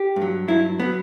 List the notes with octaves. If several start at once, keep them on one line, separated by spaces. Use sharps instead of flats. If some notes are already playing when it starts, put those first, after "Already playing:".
Already playing: G4
G2
F#3
G2 F#3 E4
F#3 B3